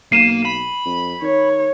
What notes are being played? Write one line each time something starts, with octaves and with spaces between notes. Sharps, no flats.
B1 A#3 C7 D#7 E7
B5
F2
D#3 C#5